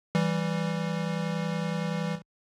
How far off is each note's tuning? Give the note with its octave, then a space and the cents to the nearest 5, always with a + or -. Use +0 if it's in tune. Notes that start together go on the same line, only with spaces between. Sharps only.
E3 +5 G3 +0